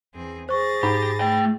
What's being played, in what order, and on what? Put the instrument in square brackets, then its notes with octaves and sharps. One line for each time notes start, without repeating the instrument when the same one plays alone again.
[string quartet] E2 C4 G#4
[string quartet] G#4 A6 A#6 [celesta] C5 C#6
[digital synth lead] G#2 [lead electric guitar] G4 [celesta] B5
[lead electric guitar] A3 G5